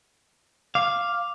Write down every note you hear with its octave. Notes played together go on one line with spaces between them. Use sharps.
F5 D6